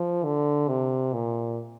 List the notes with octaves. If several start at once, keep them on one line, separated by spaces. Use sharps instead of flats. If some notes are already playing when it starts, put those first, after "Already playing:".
Already playing: F3
D3
C3
A#2